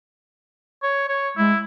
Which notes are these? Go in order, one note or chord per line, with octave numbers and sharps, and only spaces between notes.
C#5
C#5
G#3 E4